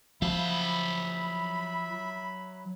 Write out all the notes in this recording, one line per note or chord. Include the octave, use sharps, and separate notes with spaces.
F3 F#3 E5 F5 B5